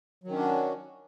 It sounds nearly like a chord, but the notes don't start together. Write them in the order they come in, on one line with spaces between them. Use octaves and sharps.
F#3 D#3 C#4 D4 F#4